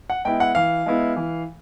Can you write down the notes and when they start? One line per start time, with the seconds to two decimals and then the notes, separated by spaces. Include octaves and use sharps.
0.10 F#5
0.25 G#3 B3 E4 G5
0.40 F#5
0.55 E3 F5
0.86 G#3 B3 E4
1.16 E3